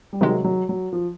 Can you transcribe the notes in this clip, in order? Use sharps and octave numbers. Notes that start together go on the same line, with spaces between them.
G3
C3 D#3 F#3 G#3
F#3
F#3
F3